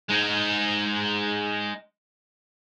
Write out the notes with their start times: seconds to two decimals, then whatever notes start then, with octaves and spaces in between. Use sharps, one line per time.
0.10 G#3 D#4